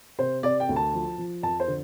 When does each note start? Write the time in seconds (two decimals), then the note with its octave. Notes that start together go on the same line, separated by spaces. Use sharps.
0.19 C3 C5
0.43 C3 D5
0.60 G5
0.69 D2
0.76 A5
0.93 F3
1.18 F3
1.43 F2 A5
1.60 C5
1.68 D3